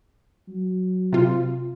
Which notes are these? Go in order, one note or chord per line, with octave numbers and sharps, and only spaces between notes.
F#3
C3 F4